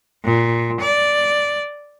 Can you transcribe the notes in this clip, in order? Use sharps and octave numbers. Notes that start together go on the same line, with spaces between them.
A#2
D5